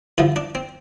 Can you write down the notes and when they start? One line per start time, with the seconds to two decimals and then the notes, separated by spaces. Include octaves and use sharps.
0.18 G2 D3 F3 E4
0.36 D4
0.55 C4